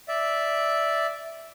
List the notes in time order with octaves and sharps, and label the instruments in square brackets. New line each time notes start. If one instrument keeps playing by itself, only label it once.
[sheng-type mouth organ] D5 E5